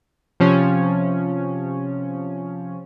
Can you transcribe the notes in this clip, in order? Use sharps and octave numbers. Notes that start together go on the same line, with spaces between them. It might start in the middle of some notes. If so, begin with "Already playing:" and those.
C3 F3 C#4